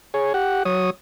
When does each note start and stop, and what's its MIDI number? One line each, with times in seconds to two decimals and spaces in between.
0.14 0.33 68
0.14 0.33 73
0.34 0.63 67
0.34 0.63 78
0.65 0.90 54
0.65 0.90 73
0.65 0.90 87